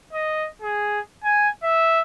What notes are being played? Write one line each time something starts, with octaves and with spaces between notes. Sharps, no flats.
D#5
G#4
G#5
E5